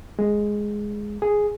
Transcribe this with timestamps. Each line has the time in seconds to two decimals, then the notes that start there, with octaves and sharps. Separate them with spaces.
0.19 G#3
1.22 G#4